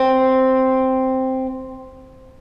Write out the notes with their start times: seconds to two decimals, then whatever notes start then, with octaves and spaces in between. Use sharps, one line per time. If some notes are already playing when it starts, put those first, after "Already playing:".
Already playing: C4